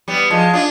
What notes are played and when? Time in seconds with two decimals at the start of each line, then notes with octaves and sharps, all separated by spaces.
0.08 G3 B3
0.30 F3 G#3
0.53 D4 F4